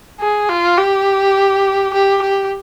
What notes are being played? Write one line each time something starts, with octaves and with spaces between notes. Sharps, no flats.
G#4
F4
G4
G4
G4